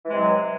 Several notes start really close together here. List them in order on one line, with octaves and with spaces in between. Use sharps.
E3 G#3 C3 F#3